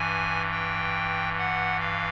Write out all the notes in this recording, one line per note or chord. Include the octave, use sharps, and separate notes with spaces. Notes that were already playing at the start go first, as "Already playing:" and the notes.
Already playing: G2 E3 G#5
G5
F#5
F5